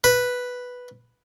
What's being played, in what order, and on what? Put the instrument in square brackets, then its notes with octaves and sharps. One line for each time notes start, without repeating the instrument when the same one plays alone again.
[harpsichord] B4